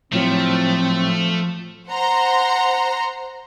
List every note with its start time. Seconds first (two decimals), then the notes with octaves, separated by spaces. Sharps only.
0.13 A2 F3 F#3 A3 C4
1.90 C5 F#5 A#5 C6